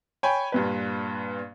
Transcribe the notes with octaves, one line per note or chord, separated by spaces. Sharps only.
C#5 G5 G#5 B5
G2 A#2 B4